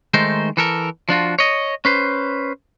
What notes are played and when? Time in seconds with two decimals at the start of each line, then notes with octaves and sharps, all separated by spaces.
0.14 D#3 G#3 A3 D#4 C5
0.57 E3 A4 A#4
1.09 F3 D4 F4 F#4
1.39 C#5 D#5
1.85 C#4 B4 C5